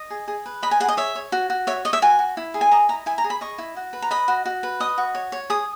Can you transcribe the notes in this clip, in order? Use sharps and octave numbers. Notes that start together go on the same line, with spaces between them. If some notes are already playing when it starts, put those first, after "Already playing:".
Already playing: D#5
G#4
G#4
B4
D#5 B5
G#5
G#4 F#5
D#5
C#5 E5
C#5
F#4
F#4
C#5 E5
C#5 D#5
E5
F#4 G#5
F#4
E4
G#4
G#5
D#5 A#5
E4 A#5
E4 G#5
A#5
G#4
B5
D#5 C#6
E4
F#4
B4
A#5
D#5 B5
F#4
F#4
B4
D#5 D#6
F#4
C#5
C#5
G#4 D#6